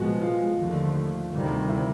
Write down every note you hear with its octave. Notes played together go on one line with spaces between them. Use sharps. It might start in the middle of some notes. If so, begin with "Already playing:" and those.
Already playing: C2 A#2 F3 G#3 B3 F#4
F4
D#2 D3 F3 A3
D2 C3 D#3 G3
E4